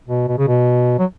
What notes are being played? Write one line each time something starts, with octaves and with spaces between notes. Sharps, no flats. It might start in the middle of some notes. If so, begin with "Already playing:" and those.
B2
B2
C#3
B2
F#3